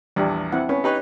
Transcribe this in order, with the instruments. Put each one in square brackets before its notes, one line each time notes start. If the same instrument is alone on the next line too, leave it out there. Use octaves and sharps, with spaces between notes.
[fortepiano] A#1 E2 [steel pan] G3 D4 G4
[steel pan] C4 E4 F#5
[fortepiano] B3 [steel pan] C#4
[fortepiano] D#4 B4 C#5 [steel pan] G4